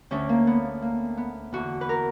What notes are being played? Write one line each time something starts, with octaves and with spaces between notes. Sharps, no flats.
D2 D3 C#4
A#3
B3
A#3
B3
E2 D3 F#4
B4
A#4